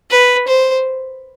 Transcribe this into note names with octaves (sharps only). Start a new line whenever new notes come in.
B4
C5